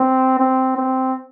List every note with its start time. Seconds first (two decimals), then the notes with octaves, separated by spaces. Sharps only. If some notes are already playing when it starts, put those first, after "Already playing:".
Already playing: C4
0.39 C4
0.77 C4